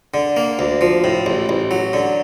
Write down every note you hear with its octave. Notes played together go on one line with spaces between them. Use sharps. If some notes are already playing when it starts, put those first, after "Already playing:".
D3
A#3
D2
F3
A2
A1
A1
F#3
D3